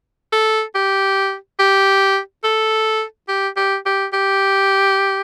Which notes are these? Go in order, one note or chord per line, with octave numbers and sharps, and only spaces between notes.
A4
G4
G4
A4
G4
G4
G4
G4